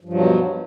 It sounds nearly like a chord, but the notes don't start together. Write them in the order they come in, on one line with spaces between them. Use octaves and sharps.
G2 F3 F#3 B2